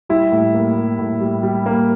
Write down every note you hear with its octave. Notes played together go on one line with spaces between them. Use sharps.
G3 E4
A2
A#3
G3
A2
G3
G3
A#3